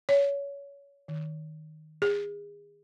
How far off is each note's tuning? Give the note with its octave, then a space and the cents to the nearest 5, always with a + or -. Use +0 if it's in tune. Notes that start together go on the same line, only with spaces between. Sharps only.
C#5 +20
D#3 -5
G#4 -30